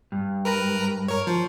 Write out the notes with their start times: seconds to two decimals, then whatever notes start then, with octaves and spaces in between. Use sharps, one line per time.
0.12 G2
0.45 A#4 B4 A#5
1.08 A#4 C#5
1.27 F3